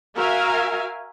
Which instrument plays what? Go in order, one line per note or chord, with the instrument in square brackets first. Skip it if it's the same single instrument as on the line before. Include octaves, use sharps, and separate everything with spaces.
[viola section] F#4 A#4 E5 F5 G#5